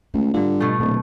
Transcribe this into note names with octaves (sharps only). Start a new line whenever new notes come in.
C#2 A3
G#2 D3 G3 F4
B2 A3
D1 D2 A#2 F#3